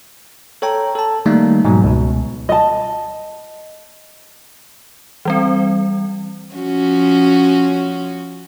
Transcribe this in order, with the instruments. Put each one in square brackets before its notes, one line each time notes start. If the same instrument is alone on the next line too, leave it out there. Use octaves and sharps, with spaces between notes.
[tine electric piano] A4 C#5 G5 A#5
A4 A5
D#3 G3 A3 A#3 D#4
G#2 B2 F#3
C#2 B2
[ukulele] D#5 A5
[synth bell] E3 G3 C4
[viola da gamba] F3 C#4 F#4